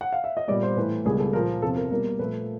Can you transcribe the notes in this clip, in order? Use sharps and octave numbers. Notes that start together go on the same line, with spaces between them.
F#5
F5
E5
D#5
A#2 G3 B3 D5
C5
A2 E3 A3 B4
C#2 B2 G3 A#3 G#4
A4
A#2 F3 A#3 A#4
E2 C3 F3 A4
A#4
B2 G3 A#3 A#4
A#2 F3 A3 B4